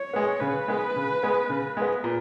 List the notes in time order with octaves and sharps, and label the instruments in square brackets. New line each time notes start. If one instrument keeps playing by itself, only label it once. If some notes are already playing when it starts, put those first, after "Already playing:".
Already playing: [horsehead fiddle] C#5
[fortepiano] G#3 B3
[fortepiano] C#3 [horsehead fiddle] B4
[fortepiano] G#3 B3
C#3
G#3 B3
C#3
G#3 B3
A#2